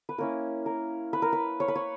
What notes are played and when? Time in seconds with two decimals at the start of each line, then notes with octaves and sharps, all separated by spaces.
0.09 B4
0.18 A#3 C#4 E4 A#4
0.66 A#4
1.13 B4
1.22 A#4
1.33 B4
1.60 C#5
1.68 B4
1.75 C#5